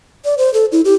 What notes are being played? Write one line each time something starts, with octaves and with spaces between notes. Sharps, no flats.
D5
C5
A4
E4
G4